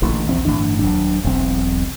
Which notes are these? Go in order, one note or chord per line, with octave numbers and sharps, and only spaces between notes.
A1 A#2 D3 E3
A#1 E2 C4
G1 A2 E3 D4
D#1 F#3 D4
E1 B1 E2 C4